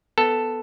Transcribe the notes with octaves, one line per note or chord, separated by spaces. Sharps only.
B3 A4